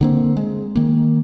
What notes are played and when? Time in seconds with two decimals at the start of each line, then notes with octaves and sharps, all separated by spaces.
0.01 D3 A#3 C4
0.37 G#3
0.75 D#3 A#3